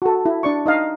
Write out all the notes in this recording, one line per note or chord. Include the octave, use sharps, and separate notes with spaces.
F#4 A4
E4
D4 D5 C#6
D#4 D#5 F5